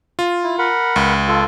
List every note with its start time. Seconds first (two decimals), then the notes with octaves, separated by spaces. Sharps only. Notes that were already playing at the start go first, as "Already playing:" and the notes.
0.19 F4
0.43 E4
0.58 A#4 F#5 B5
0.96 C#2
1.28 F4 A4